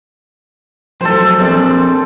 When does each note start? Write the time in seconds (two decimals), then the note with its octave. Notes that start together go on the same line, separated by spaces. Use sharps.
1.01 F3 F#3 A3 A4 C5
1.40 A#1 C4